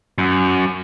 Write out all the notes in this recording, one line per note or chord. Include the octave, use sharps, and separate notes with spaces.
F#2